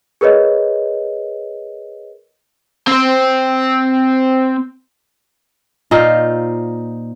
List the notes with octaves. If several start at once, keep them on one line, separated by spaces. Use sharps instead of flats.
G#4 A#4 B4 C#5 D#5
C4 C5
A#2 D#4 F4 C5